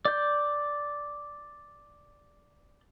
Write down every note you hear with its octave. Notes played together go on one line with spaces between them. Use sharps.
D5 G6